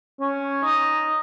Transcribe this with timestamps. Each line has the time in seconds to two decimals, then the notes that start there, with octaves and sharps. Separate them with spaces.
0.20 C#4
0.63 D#4